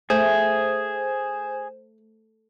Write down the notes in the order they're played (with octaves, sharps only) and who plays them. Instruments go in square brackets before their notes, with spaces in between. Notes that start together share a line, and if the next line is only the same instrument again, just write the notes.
[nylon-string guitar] A3 [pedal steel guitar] G#4 [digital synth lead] C5